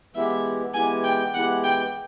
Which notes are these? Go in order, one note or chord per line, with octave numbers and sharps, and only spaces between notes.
E3 G#3 B3 E4 G4 E5
E3 G#3 B3 E4 G4 G#5
G5
E3 G#3 B3 E4 G4 F#5
G5